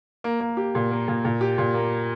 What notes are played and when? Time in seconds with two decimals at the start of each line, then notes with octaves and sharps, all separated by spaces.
0.24 A#3
0.40 A#3
0.57 G4
0.75 A#2
0.91 A#3
1.08 A#2
1.25 A#2
1.41 G4
1.58 A#2
1.74 A#3